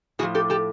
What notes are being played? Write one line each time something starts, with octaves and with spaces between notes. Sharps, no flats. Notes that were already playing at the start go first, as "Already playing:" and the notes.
A2 F3 F#4 G#4
G4 A4
G4 A4